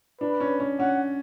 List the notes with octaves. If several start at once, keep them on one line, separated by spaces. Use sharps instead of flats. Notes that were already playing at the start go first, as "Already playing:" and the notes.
D4 B4
C#4
C#4
C#4 F#5